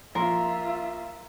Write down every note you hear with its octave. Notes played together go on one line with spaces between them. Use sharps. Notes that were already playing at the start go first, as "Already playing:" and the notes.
A#1 F4 A#4 E5 C6